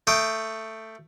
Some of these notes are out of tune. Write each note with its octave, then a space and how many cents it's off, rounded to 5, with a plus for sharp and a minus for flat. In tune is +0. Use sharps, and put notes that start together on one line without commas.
A3 +10 G5 +0 D#6 +0